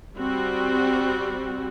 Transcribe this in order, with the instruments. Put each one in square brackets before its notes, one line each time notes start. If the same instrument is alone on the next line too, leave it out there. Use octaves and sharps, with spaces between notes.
[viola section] G3 C4 F#4